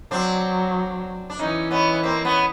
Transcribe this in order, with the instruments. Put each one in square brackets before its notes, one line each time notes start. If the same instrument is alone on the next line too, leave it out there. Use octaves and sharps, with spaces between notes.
[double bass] F#3 [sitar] C4 D4
[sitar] D4
[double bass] E3 [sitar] C#4 D#4
[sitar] B3 C#4
A#3 C4
B3 C#4